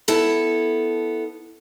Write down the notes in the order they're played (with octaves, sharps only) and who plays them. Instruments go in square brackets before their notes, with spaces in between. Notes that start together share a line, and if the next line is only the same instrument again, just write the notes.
[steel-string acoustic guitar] B3 E4 A4 A5